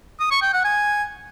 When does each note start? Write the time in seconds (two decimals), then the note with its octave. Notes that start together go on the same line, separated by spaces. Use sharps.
0.20 D#6
0.31 C#6
0.42 G5
0.53 F#5
0.64 G#5